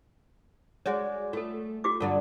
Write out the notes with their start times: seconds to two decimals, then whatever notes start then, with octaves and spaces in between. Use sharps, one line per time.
0.86 G#3 F#4 C#5 D5
1.33 A3 F4 A4
1.84 F4 G4 D6
2.00 G2 D3 F#3 F4 A4